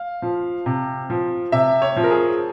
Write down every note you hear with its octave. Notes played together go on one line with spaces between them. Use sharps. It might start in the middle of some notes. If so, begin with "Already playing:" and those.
Already playing: F5
F3
C3
F3
C3 E5
C#5
F3
A#4
G#4